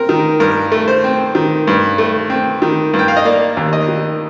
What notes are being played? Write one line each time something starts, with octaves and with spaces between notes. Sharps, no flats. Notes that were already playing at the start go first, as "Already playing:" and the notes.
Already playing: C4 A#4
D#3
G2 A#4
A3
C5
C4
D#3
G2
A3
C4
D#3
G2
G5
F5
D#5
A#3 D5
D#2
D#5
D#3